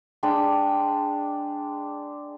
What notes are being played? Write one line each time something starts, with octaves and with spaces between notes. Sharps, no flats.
G#3 D4 D5 G5